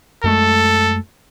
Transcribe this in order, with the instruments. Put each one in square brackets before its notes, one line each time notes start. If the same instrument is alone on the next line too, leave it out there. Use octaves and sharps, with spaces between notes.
[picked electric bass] F#2 G#3 A3 [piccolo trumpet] A4